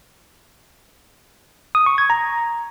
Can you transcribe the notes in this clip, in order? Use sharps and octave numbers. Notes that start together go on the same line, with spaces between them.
D#6
C#6
G#6
A#5